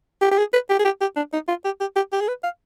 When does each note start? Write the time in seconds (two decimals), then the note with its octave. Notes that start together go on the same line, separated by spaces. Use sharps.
0.21 G4
0.31 G4
0.38 G#4
0.53 B4
0.70 G4
0.79 G#4
0.85 G4
1.01 G4
1.16 D4
1.33 D#4
1.48 F4
1.65 G4
1.81 G4
1.96 G4
2.12 G4
2.21 G#4
2.28 B4
2.44 F5